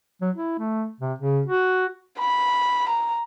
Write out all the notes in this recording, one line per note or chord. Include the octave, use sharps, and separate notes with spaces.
F#3
E4
A3
C3
C#3
F#4
B5
A#5